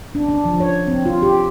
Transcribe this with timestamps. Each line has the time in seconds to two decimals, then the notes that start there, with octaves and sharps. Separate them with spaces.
0.15 D4
0.28 D4
0.45 F3
0.60 C#5
0.88 C4
1.05 F4
1.22 G4